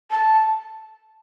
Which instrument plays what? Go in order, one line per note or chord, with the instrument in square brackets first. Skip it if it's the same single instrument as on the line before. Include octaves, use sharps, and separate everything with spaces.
[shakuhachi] A5